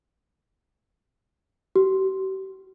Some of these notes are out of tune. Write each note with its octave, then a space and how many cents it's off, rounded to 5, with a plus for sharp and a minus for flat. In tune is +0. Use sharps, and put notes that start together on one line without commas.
G4 -45